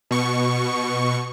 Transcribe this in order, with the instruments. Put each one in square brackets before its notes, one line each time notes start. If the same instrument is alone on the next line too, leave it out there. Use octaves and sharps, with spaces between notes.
[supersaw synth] B2 C#6